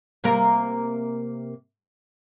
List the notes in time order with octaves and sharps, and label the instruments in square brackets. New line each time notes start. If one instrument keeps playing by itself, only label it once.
[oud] C3 A#3 A#4